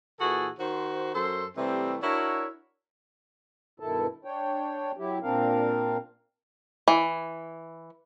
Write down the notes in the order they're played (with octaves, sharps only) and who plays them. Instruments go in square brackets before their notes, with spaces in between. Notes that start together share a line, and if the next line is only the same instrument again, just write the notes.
[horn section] A#2 E3 F#4 G#4 A4
D#3 F#4 C5
F#2 A4 C5 C6
C3 E3 G3 A3 C4
D4 E4 F#4 A#4 C#5
[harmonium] G2 B2 D#3 E4 A4 A5
D4 C#5 G5
F#3 E4 G4
A#2 C4 D4 A#4 F5
[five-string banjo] E3